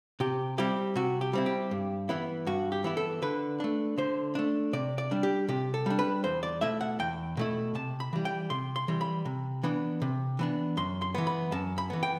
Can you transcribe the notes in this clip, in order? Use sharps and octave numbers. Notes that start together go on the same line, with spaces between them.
C3 G4
G3 C4 E4 G4
C3 F#4
G4
G3 C4 E4
G4
G2
E3 B3 E4
G2 F#4
G4
E3 B3 E4
A4
D3 B4
A3 D4
D3 C5
A3 D4
C3 D5
D5
G3 D4
G4
C3 G4
A4
G3 D4
B4
E2 C5
D5
B2 A3 E4 E5
F#5
E2 G5
B2 A3 E4
C3 A5
B5
E3 G3
G5
C3 C6
C6
E3 G3
B5
C3
E3 B3 D4
C3
E3 B3 D4
F#2 C6
C6
E3 B3
B5
F#2 A5
B5
E3 B3
G5